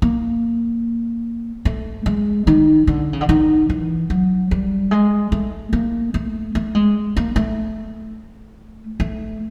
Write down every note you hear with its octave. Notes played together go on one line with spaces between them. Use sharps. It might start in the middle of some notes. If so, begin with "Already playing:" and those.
A#3
A3
G#3
D#3
D3
C#3
D3
D#3
E3
F#3
G3
G#3
A3
A#3
A3
A3
G#3
A#3
A3
A3